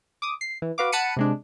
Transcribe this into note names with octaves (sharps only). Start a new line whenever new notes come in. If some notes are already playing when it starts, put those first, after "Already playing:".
D6 D#6
C7
E3
F#4 B4 F5 D6
F#5 A5 B5 B6 C#7 D#7
C3 G#3 D4